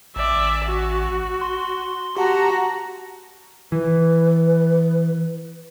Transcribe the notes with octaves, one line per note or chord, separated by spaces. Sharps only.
A1 D5 E5
F#4
C6
F#4 G4 F#5 A5 A#5
E3 B4